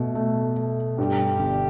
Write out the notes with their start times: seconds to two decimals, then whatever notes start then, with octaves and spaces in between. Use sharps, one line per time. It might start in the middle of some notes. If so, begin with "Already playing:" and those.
Already playing: B2 A3
0.15 A3
0.57 A3
0.98 G2 G4
1.39 G1